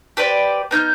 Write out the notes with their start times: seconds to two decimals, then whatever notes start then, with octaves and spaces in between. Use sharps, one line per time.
0.17 G4 B4 C5 D5
0.71 B3 D#4 F6 G6